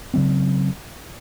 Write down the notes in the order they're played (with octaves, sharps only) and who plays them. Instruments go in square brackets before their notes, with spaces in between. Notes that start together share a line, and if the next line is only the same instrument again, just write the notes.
[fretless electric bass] C#3 F#3 C4